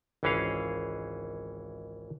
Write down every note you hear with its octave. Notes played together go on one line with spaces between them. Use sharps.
G#1 C#2 E3 C#4 G#4 F5